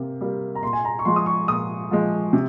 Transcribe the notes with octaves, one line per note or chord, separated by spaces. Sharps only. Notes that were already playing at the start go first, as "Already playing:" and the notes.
Already playing: C3 A#3
G3 A#3
A#5
A#2 C6
G#5
A#5
C#6
F3 G#3 C6
D#6
C#6
A#2 D#6
F3 G#3
C3